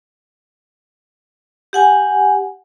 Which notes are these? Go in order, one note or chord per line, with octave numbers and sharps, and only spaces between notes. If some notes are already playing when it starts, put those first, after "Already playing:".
G4 F#5 G#5